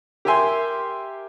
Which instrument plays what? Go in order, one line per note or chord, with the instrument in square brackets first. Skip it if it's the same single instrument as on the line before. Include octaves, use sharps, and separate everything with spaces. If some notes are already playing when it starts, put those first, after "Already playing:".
[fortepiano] G4 A#4 E5 G#5 C6